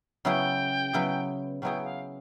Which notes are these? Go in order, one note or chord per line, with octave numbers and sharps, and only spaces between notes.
C#3 F#3 B3 E4 G#4 G5
C#3 F#3 B3 E4 G#4
C#3 F#3 B3 E4 G#4 G5
F5